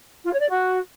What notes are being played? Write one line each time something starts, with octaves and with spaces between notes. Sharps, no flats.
F4
C#5
D5
F#4